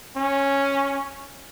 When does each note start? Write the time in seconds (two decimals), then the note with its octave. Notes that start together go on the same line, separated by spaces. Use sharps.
0.16 C#4